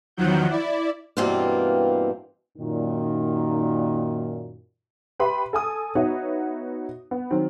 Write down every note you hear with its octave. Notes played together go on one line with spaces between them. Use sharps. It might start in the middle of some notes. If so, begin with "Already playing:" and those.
E2 D#3 F3 F#3 F#5 G6
E4 D5
G2 B2 E3 A#3 C4 F4
F#2 A#2 D#3
G4 B4 E5 B5 C6
A4 G#5 D#6
B3 D#4 F#4 C#5 E5
B3
D#3 F#3 C4